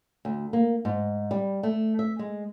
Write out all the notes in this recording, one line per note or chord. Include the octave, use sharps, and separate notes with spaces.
D2
A#3
G#2
G3
A3
E5
G#3